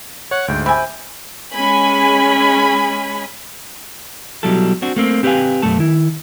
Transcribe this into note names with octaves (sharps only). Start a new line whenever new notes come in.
C#5 F#5
D2 G#2 G5
C3 G5 G#5 B5
G#3 C#4 G#5 B5
B2 F#3 G3 E4 A4
C4 D4 F#4
A3 A#3 C4
C4 G4 B4 C5 F5 G#5
B1 F#2 A3 A5
D#3 E4